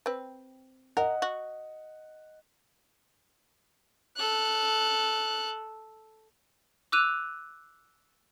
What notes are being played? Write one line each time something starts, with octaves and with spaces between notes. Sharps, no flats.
C4 B4
A#4 D#5 F#5
F#4
A4 F#6
D6 E6 F#6 D#7 F7